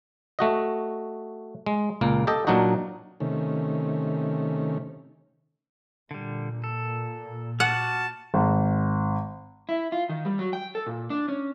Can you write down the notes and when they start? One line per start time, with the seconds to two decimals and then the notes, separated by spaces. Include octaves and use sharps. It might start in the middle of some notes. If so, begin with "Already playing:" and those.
0.39 A3 F#4 D#5
1.66 G#3
2.01 C#2 A#2 A#3
2.27 G4 A4 D#5
2.47 A#2 F#3 D4 D#4 F#4
3.20 C3 D#3 A3 C#4
6.11 A#2 D3 G3
6.64 A4
7.60 F#4 F#5 A5 D6 F6
8.34 G#1
9.69 E4
9.92 F4
10.09 D#3
10.25 G3
10.39 F#3
10.53 G5
10.75 A4
10.87 A#2
11.10 D4
11.28 C#4